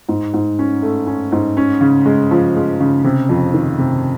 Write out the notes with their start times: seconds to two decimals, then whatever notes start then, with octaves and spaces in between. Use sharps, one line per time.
0.09 G#2
0.34 G#2
0.59 C#4
0.82 A3
1.07 C#4
1.32 G#2
1.57 C#4
1.81 C#3
2.05 G#3
2.31 F3
2.56 G#3
2.80 C#3
3.04 C3
3.29 F2
3.54 D#3
3.78 C3